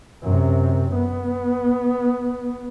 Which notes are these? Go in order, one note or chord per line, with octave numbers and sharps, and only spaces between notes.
F#2 C3
B3